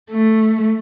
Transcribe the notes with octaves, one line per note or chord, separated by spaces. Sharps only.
A3